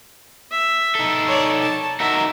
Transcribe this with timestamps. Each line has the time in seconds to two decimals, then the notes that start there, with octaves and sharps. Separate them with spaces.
0.51 E5
0.95 D#4 A4
1.27 C#5 D5
1.62 A5
2.00 D#4 F#4 A#4 E5